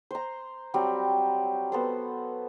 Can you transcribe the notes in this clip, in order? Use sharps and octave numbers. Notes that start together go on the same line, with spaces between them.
C5 A#5
F#3 G3 C4
B3 A4 C5